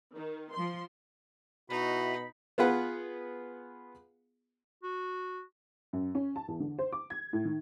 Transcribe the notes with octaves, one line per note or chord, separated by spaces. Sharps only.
D#3
F3 C6
B2 D#4 E4 F#4 B5
B3 F4 G#4 B4 F#5
F#4
F#2
C#4
A5
E2
D3
C5
D6
G#6
A2
D#3